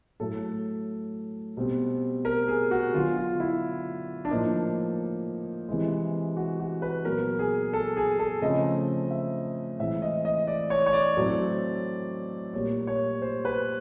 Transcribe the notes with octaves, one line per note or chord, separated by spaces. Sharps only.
A2 F#3 A3 A4
B2 G3 C4
A#4
G#4
F#4
D3 F#3 B3 F4
F4
E4
D4
A2 F3 A#3 D#4
C3 E3 G#3
F#4
F#4
B4
A#2 F#3 B3 A#4
G#4
A4
G#4
A4
C#3 F3 A3 C4 D#5
E5
A2 E3 G#3 C4 E5
D#5
D#5
D5
C#5
C#5
D5
A2 F#3 A3 C4
A#2 G3 A#3 C#5
C#5
C5
B4